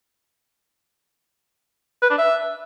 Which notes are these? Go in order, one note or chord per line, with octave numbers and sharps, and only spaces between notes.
B4
D4
E5